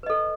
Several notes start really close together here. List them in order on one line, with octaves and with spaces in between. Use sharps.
B4 D#5 A4